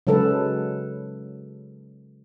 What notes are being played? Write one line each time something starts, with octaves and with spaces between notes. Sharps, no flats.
C#3 F#3 G#3 A4 B4